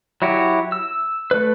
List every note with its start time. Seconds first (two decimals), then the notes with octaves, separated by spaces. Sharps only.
0.22 F#3 E4 F#4 G4
0.72 E6
1.31 A3 B4